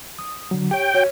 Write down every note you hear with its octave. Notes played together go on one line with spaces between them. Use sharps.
D#6
D3 F#3
G4 C#5 G5
F#4 C#5